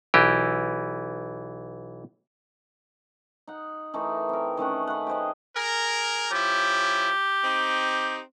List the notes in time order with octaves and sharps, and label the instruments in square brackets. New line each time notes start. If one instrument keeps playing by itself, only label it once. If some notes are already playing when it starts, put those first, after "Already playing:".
[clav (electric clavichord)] B1 E3 G4
[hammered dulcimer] D#4 F#5
E3 A3 D#4 A#4
C4 A#4
D#3 A3 C#4 F#5
B4 F5 F#5
G4 G#4 C5 D#5
[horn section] G#4 A#4
[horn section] F3 C#4 E4 [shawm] G4
[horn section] C4 D#4